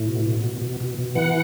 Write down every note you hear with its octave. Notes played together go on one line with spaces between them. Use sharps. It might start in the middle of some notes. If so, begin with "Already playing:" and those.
Already playing: A2
B2
B2
B2
B2
B2
B2
E3 F#5